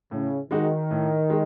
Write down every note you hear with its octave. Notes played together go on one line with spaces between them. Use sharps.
A2 C#3
D#3 G#3 D#4 F#4
A2
G#3